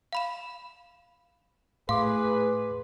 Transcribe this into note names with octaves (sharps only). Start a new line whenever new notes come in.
F5 B5 E7
A2 G#4 B4 F5 C6 D6